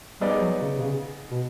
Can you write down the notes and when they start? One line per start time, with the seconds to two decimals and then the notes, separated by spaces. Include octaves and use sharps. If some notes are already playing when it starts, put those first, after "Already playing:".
0.21 G3 B3 D#4 G#4 B4 D5
0.41 F#3
0.61 C#3
0.78 C3
0.82 C#3
1.31 B2